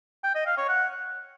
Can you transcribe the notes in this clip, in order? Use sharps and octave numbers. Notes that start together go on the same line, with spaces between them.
G5
D#5
F5
C#5
F#5